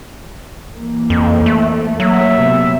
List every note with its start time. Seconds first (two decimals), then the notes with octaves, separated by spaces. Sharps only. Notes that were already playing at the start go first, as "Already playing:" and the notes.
0.78 E3 A#3
1.10 F2
1.46 A3
2.00 F#3 A#3 E5
2.35 C3 B3